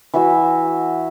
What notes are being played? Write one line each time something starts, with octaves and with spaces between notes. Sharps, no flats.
E3 F#4 E5